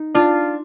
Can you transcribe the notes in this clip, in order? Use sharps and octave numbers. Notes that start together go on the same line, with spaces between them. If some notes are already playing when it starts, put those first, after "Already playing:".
Already playing: D#4
D4 F4